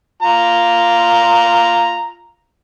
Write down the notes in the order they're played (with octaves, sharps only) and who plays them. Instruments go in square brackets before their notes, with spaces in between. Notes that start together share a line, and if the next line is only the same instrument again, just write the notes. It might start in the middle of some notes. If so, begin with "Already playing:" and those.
[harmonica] F4 A#5